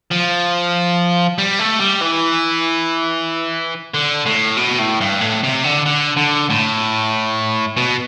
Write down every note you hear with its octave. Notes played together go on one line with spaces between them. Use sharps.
F3
G3
A3
G3
E3
D3
A2
B2
A2
G2
A2
C3
D3
D3
D3
A2
B2